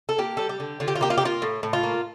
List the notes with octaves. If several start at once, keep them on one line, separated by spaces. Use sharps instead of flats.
A4
A#3 G4
G3 A4
G4
D3
D3 F4
G4
F4
A#3 G4
F4
G4
A#3 F4
A2
A2
F4
A#3